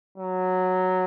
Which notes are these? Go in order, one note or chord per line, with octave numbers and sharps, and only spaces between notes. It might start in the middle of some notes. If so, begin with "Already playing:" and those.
F#3